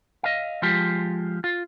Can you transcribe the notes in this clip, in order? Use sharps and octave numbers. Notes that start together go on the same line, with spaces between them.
D#5 F5
F3 G#3 F4 G4
F4